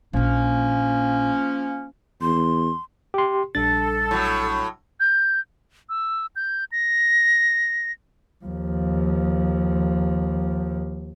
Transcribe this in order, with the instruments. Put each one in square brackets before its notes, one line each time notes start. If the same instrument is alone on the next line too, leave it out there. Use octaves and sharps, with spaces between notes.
[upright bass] A#1 D4 [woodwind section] F3 A#3 C#4
[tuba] E2 [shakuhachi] C6
[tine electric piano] G4 C6
[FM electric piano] A#1 G3 D4 [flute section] A4 [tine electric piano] A6
[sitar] A2 F#3
[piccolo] G6
E6
G6
A#6
[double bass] D#2 F3